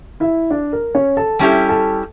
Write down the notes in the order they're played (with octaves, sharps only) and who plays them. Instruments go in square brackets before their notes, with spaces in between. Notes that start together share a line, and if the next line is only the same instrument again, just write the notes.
[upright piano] E4 E5
D4 D5
A#4
C#4 C#5
A4 A5
[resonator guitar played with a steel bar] G3 C#4 E4 G4 [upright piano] A4 A5
[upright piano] A4 A5